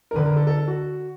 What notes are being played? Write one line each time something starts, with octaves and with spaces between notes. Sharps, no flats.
A#4
D3 B4
A#4
A4
A4
A4
F#4